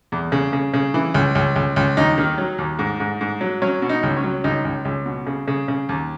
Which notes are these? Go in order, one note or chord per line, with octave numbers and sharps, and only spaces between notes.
E2
C#3
C#3
C#3
E3
C#2
C#2
C#2
C#2
D#2 D#4
D#3
F#3
D#2
G#2
G#2
G#2
F#3
F#3 C#4
B2
D#4
C#2
C#4
F#3
C#2 D#4
C#2
C#2
B2
C#3
C#3
C#3
D#2